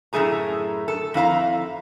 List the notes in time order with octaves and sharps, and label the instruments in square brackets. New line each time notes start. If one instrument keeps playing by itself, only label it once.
[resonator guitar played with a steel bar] F#2 A2 D#3 A3 G#4 A#5
A4
F2 E4 F5 A#5